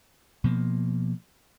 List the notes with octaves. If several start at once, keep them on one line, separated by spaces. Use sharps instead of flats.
B2 F3 A#3